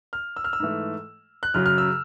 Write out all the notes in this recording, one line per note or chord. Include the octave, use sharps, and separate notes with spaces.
F6
E6
F6
E6
G#2 E3 A3
F#6
F#2 C#3 F#3 F6
F6
E6